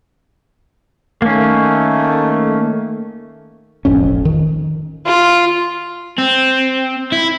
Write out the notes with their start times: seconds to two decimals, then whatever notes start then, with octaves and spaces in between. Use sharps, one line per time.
1.22 D#3 A3 A#3 C#4
3.85 E1 A1 F2 C#4
4.25 D#3
5.06 F4
6.18 C4
7.12 E4